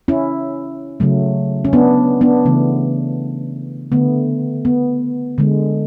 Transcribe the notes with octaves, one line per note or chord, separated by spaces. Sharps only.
C#4 E4
C#3 F#3 A3
C#4
B3 D4
B3 D4
C#3 E3 A3
D3 A3 B3
B3
D3 G#3